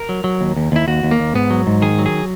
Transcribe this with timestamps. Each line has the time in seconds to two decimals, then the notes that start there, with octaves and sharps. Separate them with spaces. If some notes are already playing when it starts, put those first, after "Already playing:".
Already playing: A#4
0.09 F#3
0.24 F#3
0.41 D#2
0.56 D#2
0.72 D#2 E4
0.88 D#2 F#4
1.03 D#2
1.11 A#3
1.20 D#2
1.34 G#2 B3
1.50 F#3
1.67 G#2
1.82 D#3 G#4
1.99 F#3
2.06 G#4